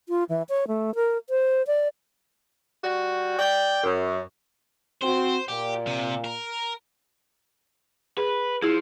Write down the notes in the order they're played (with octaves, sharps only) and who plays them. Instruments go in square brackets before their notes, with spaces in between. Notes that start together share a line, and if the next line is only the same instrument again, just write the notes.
[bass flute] F4
E3
C#5
A3
A#4
C5
D5
[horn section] G3 F#4
D5 G5
F#2
[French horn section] C4 F#4 [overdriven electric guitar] C5
[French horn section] A#2 [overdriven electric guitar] G4
[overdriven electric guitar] C3
A#4
[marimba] G#4 [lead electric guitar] B4
[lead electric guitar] F3 [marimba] E4 G#4